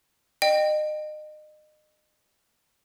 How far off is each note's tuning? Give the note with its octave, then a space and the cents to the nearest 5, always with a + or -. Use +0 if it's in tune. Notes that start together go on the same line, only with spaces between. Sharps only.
D#5 -30 G5 +0